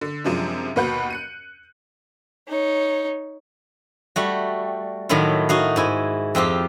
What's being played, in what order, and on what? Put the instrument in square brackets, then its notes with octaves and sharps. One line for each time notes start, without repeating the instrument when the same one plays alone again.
[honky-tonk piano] D3
F#2 C3 F3 G#3 D4
D#2 B2 B4 F#5 G6
F#6 C#7 D#7
[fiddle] D#4 C#5
[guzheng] G3 A3 F#4
A2 D#3 F#3 A3 E4 F4
D#4 F#4 F5
G#2 E4 G#5
F2 C4 F4 G4